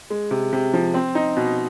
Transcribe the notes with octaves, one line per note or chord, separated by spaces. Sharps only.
G#3
C3
C3
F3
C4
D#4
B2